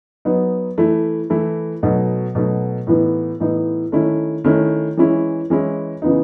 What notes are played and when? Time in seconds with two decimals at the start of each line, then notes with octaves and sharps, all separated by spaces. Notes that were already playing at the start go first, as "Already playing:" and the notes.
0.25 F#3 B3 D#4
0.78 E3 A3 E4
1.30 E3 A3 E4
1.83 B2 F#3 A3 D#4
2.35 B2 F#3 A3 D#4
2.87 A2 E3 B3 D#4
3.40 A2 E3 B3 D#4
3.92 D#3 A3 C#4 E4
4.44 D#3 A3 C#4 E4
4.97 E3 G#3 C#4 E4
5.50 E3 G#3 C#4 E4
6.02 C#3 E3 B3 D#4